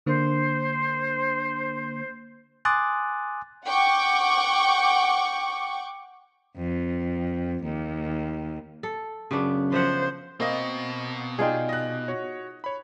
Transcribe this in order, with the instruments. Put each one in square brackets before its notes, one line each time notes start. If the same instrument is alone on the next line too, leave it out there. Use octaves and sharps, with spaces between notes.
[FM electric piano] D3 A#3 D4 [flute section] C5
[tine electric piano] G#5 C6 D6 D#6 F#6 A6
[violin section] F#5 G5 C#6 D6
[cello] F2
D#2
[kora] A4
[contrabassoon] F#2 [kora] C#3 B3 D4
[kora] F3 E5 F#5 [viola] C5
[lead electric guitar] B2 [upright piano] A#3 D#5 [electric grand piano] C4
[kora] D#4 F4 G#4 [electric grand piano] D5 G5
[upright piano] D#5 F#6
[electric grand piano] F#4 C#5
C#5 B5